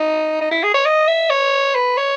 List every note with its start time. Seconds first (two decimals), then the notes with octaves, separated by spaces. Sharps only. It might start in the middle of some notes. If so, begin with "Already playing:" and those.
Already playing: D#4
0.41 D#4
0.51 E4
0.63 G#4
0.74 C#5
0.86 D#5
1.07 E5
1.30 C#5
1.75 B4
1.97 C#5